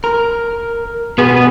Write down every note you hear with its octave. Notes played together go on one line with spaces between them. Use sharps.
A#4
B2 B3 G#4 G#5